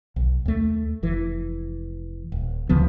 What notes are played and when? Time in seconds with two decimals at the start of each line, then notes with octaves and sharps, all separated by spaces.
0.16 B1
0.45 D#2 A3
1.03 F1 E3
2.32 D#1
2.69 D2 C#3 F3 B3